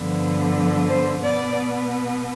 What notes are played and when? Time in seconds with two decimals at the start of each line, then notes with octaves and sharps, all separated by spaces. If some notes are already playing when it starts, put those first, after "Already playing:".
Already playing: G2 D3 F3 B3
0.89 C5
1.23 B2 B3 D5